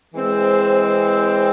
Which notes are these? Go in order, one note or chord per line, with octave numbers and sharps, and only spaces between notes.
E3 G#3 C4